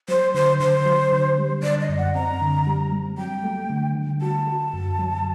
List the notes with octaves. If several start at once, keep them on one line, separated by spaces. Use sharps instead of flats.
F#3 C5
D3 C5
D3 C5
F#3
D3
G3
D3 D5
D#5
F#2
F#5
C4 A#5
D3
G3
G3
F#3 G5
A3
D3
D3
F#4 A5
F#4
F#2
F#3